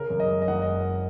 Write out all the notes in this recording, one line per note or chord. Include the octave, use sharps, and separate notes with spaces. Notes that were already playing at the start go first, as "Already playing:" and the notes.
Already playing: C#3 A#4
F#2
D#5
G#3
D#5
F#1 F#5
D#5